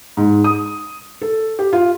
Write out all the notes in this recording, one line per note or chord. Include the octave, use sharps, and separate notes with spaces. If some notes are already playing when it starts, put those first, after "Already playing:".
G#2
D#6
A4
G4
F4